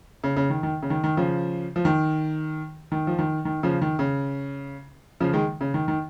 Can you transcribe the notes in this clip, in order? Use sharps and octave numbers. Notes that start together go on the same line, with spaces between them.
C#3
C#3
D#3
D#3
C#3
D#3
D#3
C#3 F3
F3
D#3
D#3
F3
D#3
D#3
C#3 F3
D#3
C#3
C#3 F3
D#3 G#3
C#3
D#3
D#3